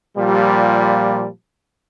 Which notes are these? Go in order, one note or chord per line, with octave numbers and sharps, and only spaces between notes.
A#2 F3 G3